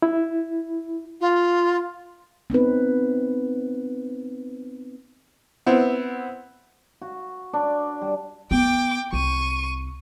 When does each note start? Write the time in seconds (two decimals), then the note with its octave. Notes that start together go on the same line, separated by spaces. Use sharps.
0.02 E4
1.21 F4
2.50 B3 C4 D#4 B4
5.66 B3 C4 E4
7.02 F#4
7.53 D4
8.02 G3
8.51 B3 G5 D6
9.13 C2 C#6 D#7